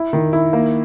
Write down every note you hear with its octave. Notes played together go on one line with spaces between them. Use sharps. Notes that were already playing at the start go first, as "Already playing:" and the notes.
Already playing: E4
D#3
E4
A#3